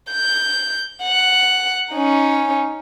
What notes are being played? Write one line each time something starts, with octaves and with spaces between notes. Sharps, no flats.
G6
F#5
C#4 D#4